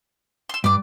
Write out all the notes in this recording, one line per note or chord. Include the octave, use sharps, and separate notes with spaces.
C6 E6
G2 D5 D6